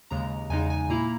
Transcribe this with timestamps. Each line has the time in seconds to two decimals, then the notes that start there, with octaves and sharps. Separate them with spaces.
0.11 D#2 C#3 G#3 A#5
0.50 E2 C#3 G#3 D#4 G#5
0.70 G#5
0.89 A#2 A#3 E4 A#5